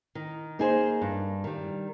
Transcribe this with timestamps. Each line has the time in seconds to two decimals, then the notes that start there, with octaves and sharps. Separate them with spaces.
0.15 D#3
0.59 A#3 D#4 G#4 C5
1.02 G2
1.44 D#3 G3